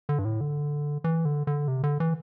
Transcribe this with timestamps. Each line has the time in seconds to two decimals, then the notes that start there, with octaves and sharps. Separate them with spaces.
0.09 D3
0.19 G2
0.25 A2
0.41 D3
1.04 E3
1.25 D3
1.47 D3
1.68 C3
1.84 D3
2.00 E3